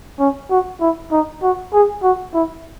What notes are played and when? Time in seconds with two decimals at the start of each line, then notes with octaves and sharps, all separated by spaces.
0.19 C#4
0.50 F#4
0.81 E4
1.12 D#4
1.42 F#4
1.73 G#4
2.03 F#4
2.34 E4